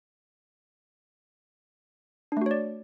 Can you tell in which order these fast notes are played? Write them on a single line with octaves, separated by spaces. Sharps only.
D4 A3 F#4 C#5 D5